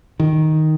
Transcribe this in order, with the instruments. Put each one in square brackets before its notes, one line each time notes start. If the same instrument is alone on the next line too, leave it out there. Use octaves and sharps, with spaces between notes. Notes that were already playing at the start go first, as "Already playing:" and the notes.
[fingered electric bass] D#3